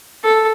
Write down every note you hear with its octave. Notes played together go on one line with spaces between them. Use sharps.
A4